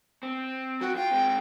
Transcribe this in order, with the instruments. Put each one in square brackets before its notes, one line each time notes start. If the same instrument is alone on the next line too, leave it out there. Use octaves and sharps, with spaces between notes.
[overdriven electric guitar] C4
[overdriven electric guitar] F#2 G5 [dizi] F#4
[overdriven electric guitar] F4 [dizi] G5
[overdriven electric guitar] G#3 C4